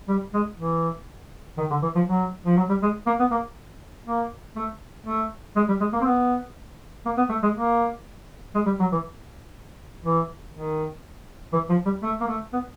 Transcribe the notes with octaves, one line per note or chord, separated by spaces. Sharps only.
G3
G#3
E3
D#3
D3
E3
F3
F#3
F3
F#3
G3
G#3
A#3
B3
A#3
A#3
A3
A3
G#3
G3
G#3
A#3
C4
B3
A#3
B3
A3
G#3
A#3
G#3
G3
F#3
E3
E3
D#3
E3
F3
G3
A3
A#3
A3
B3